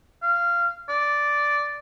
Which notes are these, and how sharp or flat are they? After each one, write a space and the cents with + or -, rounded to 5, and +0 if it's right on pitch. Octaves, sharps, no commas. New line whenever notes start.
F5 -15
D5 -5